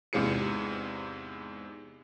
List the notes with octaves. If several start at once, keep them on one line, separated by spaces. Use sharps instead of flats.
E2 G#2 C3 F4 G#4 C#7